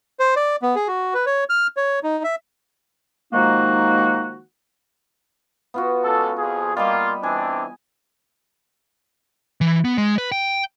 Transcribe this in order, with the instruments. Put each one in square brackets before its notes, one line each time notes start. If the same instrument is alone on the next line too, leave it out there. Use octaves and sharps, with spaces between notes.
[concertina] C5
D5
B3
G#4
F#4
B4
C#5
F6
C#5
D#4
E5
[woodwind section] D#3 F3 G#3 A#3 D#4 F#4
[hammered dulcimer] B3 F4 F#4
[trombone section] C#2 A4
F2 F3 G#4
[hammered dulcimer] G3 D#5 B5 [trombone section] A#3 F4
[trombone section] E3 C4 D4 [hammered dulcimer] G#5
[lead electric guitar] E3
B3
G#3
B4
G5